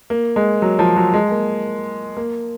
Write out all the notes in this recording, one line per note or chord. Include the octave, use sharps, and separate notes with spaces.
A#3
G#3
F#3
F3
F#3
G#3
A#3
A#3